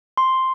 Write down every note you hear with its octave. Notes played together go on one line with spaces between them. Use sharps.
C6